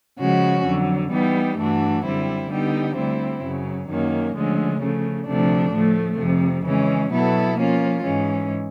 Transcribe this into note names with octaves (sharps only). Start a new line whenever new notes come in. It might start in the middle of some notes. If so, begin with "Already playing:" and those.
C#3 F3 G#3 C#4 F#4
F2 D3 F#3
E3 G3 B3 D#4 G4
G2 E3 A3 D4 F#4
F#2 D3 G3 C4 E4
D3 G3 B3 D#4 G4
D2 D3 G3 C4 E4
F#2 C#3 F#3
F#2 D#3 F#3 A#3 C#4
D2 D3 F3 G#3 C#4
C#3 F3 A3
D2 C3 F3 A3 D4
A2 F3 A3
F2 C3 F3
C#3 E3 G#3 C#4
B2 F#3 B3 E4 A4
F3 A#3 C#4 F4
G#2 E3 G#3 C#4